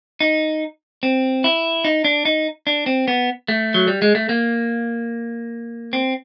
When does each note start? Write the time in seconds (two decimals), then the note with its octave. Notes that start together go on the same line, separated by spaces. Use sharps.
0.20 D#4
1.03 C4
1.44 E4
1.85 D#4
2.05 D4
2.25 D#4
2.67 D4
2.86 C4
3.08 B3
3.48 A3
3.74 F#3
3.88 G3
4.02 G#3
4.15 A3
4.29 A#3
5.93 C4